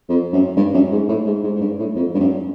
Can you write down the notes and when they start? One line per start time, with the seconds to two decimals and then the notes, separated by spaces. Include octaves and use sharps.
0.09 F2
0.33 F#2
0.56 G2
0.74 F#2
0.91 G#2
1.09 A2
1.26 G#2
1.44 G#2
1.55 G#2
1.61 G2
1.79 A2
1.96 F2
2.14 G2
2.19 F#2